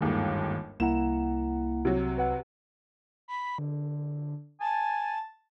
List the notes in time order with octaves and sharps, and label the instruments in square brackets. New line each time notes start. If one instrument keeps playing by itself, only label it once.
[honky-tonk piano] G1 D#2 G#2 [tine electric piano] D#3
[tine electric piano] C2 A#5 [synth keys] A#3 E4 F#5 [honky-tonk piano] E7
[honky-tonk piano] C3 F#3
[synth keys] B4 F#5
[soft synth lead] B5
D3
[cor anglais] G#5 [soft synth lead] A5